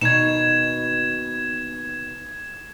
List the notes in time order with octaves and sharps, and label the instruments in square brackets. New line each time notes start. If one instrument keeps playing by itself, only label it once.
[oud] D#2 B2 D#4 [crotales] G#6 E7